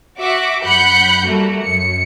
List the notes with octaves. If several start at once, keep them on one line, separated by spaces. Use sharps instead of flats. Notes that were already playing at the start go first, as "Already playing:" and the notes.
F#4 E5 D6
F#2 F#5 B5 F#6 G6 C#7
G3 A3 A#3 F#4
F#2 C#7